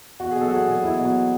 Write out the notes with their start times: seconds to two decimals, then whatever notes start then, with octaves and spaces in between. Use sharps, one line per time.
0.20 E2 F#4
0.31 G#4
0.36 B2 F#3 A4
0.48 F#4
0.51 E2 G#4
0.68 B2 F#3 G#4
0.84 E2 E4
0.99 B2 F#3 F#4